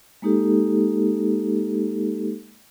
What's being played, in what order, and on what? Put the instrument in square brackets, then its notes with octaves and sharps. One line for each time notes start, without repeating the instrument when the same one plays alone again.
[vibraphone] G#3 A#3 D#4 G4 A4